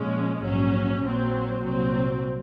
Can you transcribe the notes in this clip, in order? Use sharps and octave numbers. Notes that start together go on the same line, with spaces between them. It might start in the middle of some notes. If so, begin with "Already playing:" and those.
Already playing: A#2 F3 G#3 C#4
A#1 G#2 F#3 C#4
A#1 A#2 F#3 C4
C2 A#2 F#3 C4